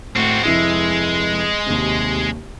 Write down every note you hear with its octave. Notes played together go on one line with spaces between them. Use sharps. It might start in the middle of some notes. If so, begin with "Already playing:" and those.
A2 C4 F#4
F1 G#3 E4 C#7
D#2 C3